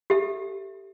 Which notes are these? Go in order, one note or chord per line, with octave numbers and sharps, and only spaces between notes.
G4 A4 E5